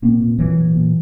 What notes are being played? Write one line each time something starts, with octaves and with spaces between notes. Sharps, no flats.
A#2 A#3 C4
A#2
A#2 E3 F#3
A#2
A#2